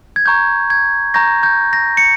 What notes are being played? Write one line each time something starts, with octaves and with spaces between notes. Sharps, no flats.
G#6
A#5 C#6 G6
G#6
A#5 C#6 G6 A#6
G6
A#6
C#7